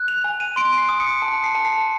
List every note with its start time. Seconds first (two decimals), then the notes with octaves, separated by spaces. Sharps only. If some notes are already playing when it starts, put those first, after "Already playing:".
Already playing: F#6
0.08 F7
0.24 G#5
0.40 D#7
0.56 C6 D7
0.78 C7
0.89 D#6
1.00 C#7
1.22 A5 C#7
1.44 C7
1.55 A5
1.65 C7